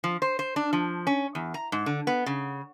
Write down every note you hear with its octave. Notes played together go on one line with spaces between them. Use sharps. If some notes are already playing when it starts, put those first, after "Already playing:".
F3
C5
C5
D4
F3
C#4
E2
A#5
G#2
D3
B3
C#3